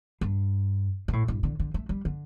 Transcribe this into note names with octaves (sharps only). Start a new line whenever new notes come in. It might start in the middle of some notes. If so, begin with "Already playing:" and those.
G2
B2
A2
G2
D3
D3
A3
G3
D3